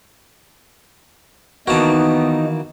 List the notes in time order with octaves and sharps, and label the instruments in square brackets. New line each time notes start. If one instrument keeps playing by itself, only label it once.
[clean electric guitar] D#3 E3 A#3 [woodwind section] B3 [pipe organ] D#4 [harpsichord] F#4 A5